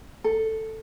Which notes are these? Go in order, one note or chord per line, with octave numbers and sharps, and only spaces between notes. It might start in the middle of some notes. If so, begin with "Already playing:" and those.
A4